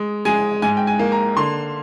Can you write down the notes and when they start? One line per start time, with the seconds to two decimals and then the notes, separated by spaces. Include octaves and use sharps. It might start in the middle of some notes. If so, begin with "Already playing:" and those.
Already playing: G#3
0.25 G#3 G#5
0.62 G#2 G#5
0.77 G5
0.87 G#5
0.99 A#3
1.12 A#5
1.36 D3 C6